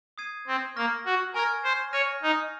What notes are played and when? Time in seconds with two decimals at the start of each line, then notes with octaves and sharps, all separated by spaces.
0.18 D#6 G#6 C7 D#7
0.47 C4
0.76 A#3 C#6 F6 A#6
1.06 F#4
1.34 A#4 G#5 C#6 F6 G#6
1.64 C5
1.93 C#5 F6 A#6 D#7
2.22 D#4